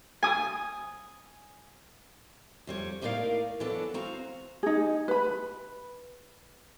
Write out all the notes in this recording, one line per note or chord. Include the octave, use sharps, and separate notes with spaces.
G#5 D#6
F2 G3 C#5
A2 A#3 D#4 A#4 D5 F5
E3 F#3 B3 D4 A4
C4 F#4 F5 A#5
D#4 G#4
B4 B5